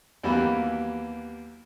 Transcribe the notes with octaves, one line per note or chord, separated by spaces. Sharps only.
D#2 E3 F#3 G3 A#3 B3